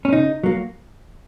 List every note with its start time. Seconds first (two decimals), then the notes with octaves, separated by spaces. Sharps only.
0.05 C#4
0.13 C#3 D#4
0.43 F#3 A#3